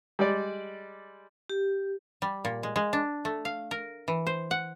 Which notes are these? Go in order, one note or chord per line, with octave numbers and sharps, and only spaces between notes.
G3 G#3 D5
G4
G3
A#2
G#3
G#3
D4
A3
F5
A#4
E3
C5
F#5